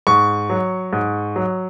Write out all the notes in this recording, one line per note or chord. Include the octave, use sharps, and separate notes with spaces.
G#2 C#6
F#3
G#2
F#3